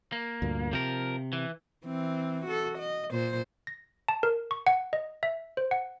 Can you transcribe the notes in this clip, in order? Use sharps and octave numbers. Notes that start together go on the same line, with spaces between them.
A#3
D2 G2 A#2
C3 F3 A#4
E3
E3 C4
F#4 A4
D#5
A#2 C5
A#6
A5
A#4
C#6
F#5
D#5
E5
C5
F#5